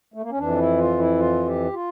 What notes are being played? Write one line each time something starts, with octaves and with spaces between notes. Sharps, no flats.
A3
A#3
C#4
F2 E3 D4
E4
F4
E4
F4
G4
F4